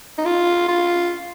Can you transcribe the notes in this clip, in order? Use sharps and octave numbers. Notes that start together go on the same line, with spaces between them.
D#4
F4
F4